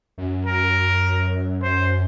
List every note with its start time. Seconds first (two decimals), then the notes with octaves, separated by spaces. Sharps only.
0.18 F#2
0.46 A#4
1.62 C5